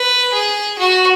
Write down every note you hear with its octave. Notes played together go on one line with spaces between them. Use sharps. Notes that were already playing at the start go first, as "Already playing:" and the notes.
Already playing: B4
G#4
F#4